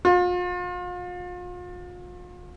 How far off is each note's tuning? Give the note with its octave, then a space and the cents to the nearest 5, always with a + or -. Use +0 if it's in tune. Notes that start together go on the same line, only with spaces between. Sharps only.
F4 +40